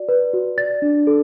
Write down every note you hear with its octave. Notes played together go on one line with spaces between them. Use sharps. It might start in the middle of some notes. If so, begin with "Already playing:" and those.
Already playing: F#4 D5
B4
F#4
D5 A6
D4
A4